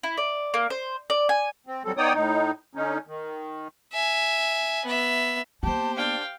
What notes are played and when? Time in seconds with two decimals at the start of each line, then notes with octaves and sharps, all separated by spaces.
0.03 E4
0.17 D5
0.54 A#3
0.70 C5
1.10 D5
1.29 G#5
1.67 C4
1.85 F#3 G3 C4 A4
1.97 B3 D#4 C#5 D5 G5 D#6
2.14 A2 D#4
2.75 D3 C#4 D#4
3.07 D#3
3.93 E5 G#5
4.85 B3 E5
5.63 A#3 B3 G4 C5 A5
5.97 D4 F5 G5